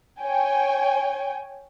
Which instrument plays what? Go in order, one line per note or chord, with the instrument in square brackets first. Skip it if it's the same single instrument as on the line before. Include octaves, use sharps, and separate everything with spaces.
[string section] C#5 G5 G#5